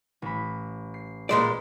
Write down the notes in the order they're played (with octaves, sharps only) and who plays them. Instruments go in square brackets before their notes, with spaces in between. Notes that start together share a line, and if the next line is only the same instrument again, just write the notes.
[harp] A1 B5
C7
[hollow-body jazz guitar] A#2 G#3 D5 [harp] B4